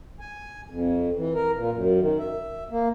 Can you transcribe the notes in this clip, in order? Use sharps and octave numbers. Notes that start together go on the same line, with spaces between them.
G#5
F2
E3
A#4
A#2
F#2
D#3
E5
A#3